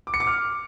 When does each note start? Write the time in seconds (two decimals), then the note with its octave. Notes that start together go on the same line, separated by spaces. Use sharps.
0.07 D6
0.14 C#7
0.20 D6
0.27 F6